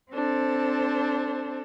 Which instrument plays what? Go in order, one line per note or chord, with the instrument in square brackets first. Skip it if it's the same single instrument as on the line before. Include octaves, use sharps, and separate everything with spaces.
[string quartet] C4 D4 A4 C5